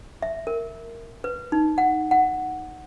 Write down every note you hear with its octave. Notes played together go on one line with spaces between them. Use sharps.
E5
A#4
B4
D#4
F#5
F#5